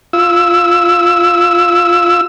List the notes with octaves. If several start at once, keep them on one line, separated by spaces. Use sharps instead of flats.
F4 E6